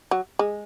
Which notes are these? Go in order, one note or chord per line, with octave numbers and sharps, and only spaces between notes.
F#3
G#3